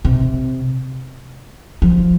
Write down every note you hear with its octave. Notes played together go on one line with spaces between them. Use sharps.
C3
F3